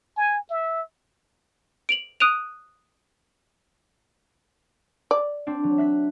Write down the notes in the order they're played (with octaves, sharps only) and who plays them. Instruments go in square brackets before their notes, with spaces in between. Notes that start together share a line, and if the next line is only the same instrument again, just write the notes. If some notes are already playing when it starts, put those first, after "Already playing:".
[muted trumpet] G#5
E5
[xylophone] D7 F7 F#7
D#6 F#6 D7 D#7 F7
[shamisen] D5
[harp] C4 D4
F#3
E5 F#6 B6